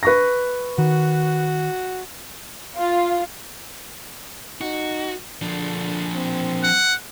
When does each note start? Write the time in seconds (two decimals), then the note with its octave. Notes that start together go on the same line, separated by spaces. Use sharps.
0.03 B4 C#6 A#6
0.78 D#3 F#4
2.77 F4
4.61 D#4 F#4
5.42 D3 F3 D4
6.15 C4
6.63 F#5